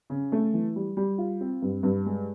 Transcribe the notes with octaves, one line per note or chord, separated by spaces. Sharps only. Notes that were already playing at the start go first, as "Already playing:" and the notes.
C#3
A3
E3
G3
G3
F4
C4
G2
G2
G#3